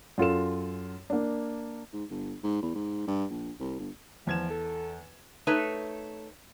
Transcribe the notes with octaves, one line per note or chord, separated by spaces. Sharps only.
F#2 F4 A4 E7
A#3 D4
G#2
G1
G#2
E2
G#2
G2
A#1
C2
G1
E2 F3 G#6 E7
A4
A3 D#4 B4 C#5